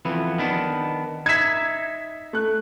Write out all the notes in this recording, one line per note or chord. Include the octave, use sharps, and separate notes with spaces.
F2 E3 B3
D#3 B3 D4
D#4 E5 G#6 B6
A3 F#6